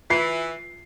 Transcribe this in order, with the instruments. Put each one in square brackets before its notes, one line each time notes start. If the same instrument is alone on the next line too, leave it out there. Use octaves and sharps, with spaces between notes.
[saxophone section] E3 [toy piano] F4 E5 [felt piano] C7